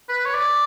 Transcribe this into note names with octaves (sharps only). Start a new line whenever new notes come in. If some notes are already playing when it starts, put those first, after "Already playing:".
B4
C#5
D5